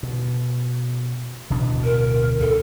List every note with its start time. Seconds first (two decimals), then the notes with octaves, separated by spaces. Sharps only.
0.03 B2
1.50 D1 B2 D4
1.84 A#4
2.40 D2 A4